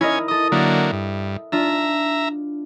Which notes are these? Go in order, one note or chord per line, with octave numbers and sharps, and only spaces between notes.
C#4 E4 A#4 D#5 G#5
A4 D#5 D#6
D3 F#3 A#3 E5 A6
G2
D4 F4 E5 A#5